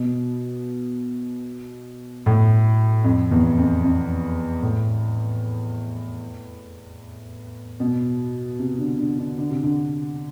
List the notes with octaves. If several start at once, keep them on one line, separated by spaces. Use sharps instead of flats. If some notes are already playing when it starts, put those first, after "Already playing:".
Already playing: B2
A2
F2
E2
F2
F2
A2
B2
C3
D3
D3
D3
D3
C3
D3